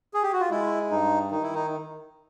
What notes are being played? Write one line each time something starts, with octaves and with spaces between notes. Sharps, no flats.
G#4
G4
F#4
F4
G#3 E4
G2 D#4
D#3 D#4
E4
D#4